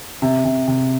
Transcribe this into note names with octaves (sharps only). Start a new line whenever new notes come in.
C3
C3
C3